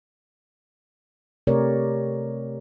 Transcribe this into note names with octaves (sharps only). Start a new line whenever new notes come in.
C3 A3 G4 A#4 C#5 D5